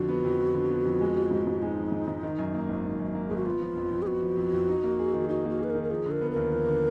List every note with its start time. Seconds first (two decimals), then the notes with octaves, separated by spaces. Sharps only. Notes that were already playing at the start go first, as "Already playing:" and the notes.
Already playing: F2 D3 F3 F#4
0.09 B3
0.24 F2
0.40 F3
0.54 D3
0.70 B3
0.85 F2
1.01 G#3
1.16 F3
1.31 G#2
1.47 G#2
1.62 G#3 D#4
1.77 F3
1.92 G#2
2.08 G#2
2.23 D#3
2.39 F#2
2.54 A#3
2.69 G#1
2.84 D#3
3.00 F#2
3.15 A#3
3.28 G#1 G#4
3.37 F#4
3.45 B3 F4
3.61 F3
3.76 F2
3.91 F2
4.02 G#4
4.07 B3 F#4
4.22 F3
4.37 F2
4.53 F2
4.68 D#4
4.84 A#3
4.99 G#4
5.14 D#3
5.29 D#4 F#4
5.45 A#3 F#4
5.59 G#4 B4
5.70 A#4
5.75 D#3
5.83 A#4
5.90 F3 G#4
6.06 D3 A#4
6.21 B3
6.31 D#2 A#4
6.52 F3
6.67 D3